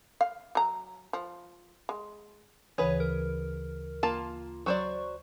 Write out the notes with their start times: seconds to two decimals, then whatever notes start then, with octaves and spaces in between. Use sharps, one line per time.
0.21 F5
0.55 F#3 A#5
1.13 F3
1.89 G#3
2.78 D2 C#3 E3 G#4 B4 C#5
3.00 A#4
4.03 A#3 F4 A5
4.66 F#3 C5 D5 C#6